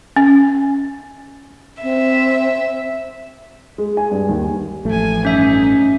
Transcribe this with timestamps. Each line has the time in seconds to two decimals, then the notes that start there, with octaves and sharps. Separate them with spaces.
0.16 C#4
1.83 C4 E5
3.78 G#3
3.97 G#5
4.11 G2
4.29 D#2
4.85 A1 F3 A3 G#5
5.25 G2 C#4 D#4 E5